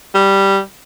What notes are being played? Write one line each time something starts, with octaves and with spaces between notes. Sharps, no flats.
G3